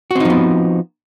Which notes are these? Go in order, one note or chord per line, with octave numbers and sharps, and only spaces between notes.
F3 B3 C4 D#4 F#4